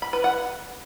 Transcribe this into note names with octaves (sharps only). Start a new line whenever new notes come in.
B5
B4
F#5